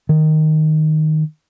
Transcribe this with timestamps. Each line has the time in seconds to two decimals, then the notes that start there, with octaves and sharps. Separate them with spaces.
0.09 D#3